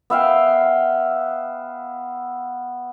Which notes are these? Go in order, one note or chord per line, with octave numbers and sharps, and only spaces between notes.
B3 E5 F5 G5